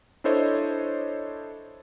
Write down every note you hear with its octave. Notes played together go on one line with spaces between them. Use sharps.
D4 E4 A4 C5 C#5 D#5